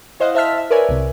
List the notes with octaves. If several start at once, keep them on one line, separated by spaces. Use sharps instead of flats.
E4 C5 D#5 F5 F#5
C5 E5 A5 E6 F6 B6
E5
A#4 B4 C#5 D5 E5 G#5
C2 C3